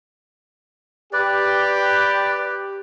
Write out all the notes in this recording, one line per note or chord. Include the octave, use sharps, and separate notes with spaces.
G4 B4 D5